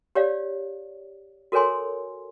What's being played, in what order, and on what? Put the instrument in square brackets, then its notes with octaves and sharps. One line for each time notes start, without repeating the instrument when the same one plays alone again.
[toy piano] G4 C#5 D5 F5
F#4 A4 A#4 C#5 G#5 C6